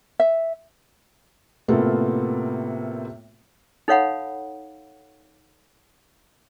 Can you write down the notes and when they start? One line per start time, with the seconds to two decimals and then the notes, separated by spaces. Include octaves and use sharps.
0.20 E5
1.68 A2 C3 A#3 B3 F4 A4
3.88 D#4 A4 C#5 F5 F#5 B5